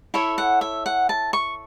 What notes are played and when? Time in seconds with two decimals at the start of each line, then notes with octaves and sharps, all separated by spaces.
0.14 E4 A4 C#5 E5
0.38 F#5
0.61 E5
0.86 F#5
1.09 A5
1.33 C#6